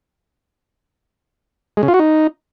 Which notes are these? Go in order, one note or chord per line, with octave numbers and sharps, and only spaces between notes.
G#3
C#3
F4
F#4
D#4